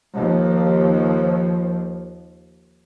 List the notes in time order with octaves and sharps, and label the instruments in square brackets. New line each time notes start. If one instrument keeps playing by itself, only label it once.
[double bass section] D#2 F3